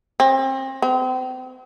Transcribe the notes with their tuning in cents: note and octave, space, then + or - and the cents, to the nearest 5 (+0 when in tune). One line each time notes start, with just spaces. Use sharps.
C4 +35
C4 -35